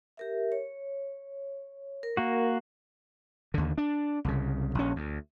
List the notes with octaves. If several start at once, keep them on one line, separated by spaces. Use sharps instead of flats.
G4 A#4 E5
C#5
A#4
A#3 F#4
D#2 D3
D4
C2 C#3
A#1 C#4
D2